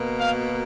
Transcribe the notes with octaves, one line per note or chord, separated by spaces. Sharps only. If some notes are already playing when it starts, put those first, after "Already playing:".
Already playing: B2 A#3
F5